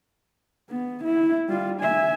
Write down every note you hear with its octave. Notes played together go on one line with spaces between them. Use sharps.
B3
E4
G3 F4
E5 G#5